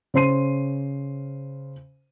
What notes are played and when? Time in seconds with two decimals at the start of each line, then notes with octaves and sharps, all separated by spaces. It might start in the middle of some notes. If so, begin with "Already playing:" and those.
0.14 C#3 C5 C6 C7 D#7